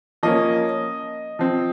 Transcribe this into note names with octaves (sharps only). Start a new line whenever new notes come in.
F3 A#3 C#4 D#5
F3 C4